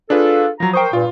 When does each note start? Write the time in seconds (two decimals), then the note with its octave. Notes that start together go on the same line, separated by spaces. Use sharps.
0.10 D4 F4 G#4 A4 B4
0.60 F3 F#3 A#5
0.74 A#4 C5 G5 C#6 D#6
0.93 G2 A#2 F4